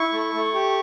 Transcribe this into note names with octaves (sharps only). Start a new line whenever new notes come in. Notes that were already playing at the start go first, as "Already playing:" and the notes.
Already playing: E4 C#6
A3
A3
G4